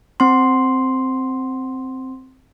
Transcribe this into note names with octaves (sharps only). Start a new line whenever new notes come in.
C4 C6